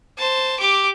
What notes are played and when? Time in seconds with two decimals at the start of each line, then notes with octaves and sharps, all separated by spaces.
0.18 C5 A5
0.59 G4 D6